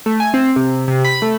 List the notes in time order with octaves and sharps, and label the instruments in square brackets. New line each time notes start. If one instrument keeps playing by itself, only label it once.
[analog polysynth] A3
G#5
C4
C3
C3
B5
A3